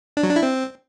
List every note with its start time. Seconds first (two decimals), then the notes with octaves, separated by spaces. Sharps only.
0.17 D4
0.23 F#3
0.30 D4
0.36 E4
0.43 C4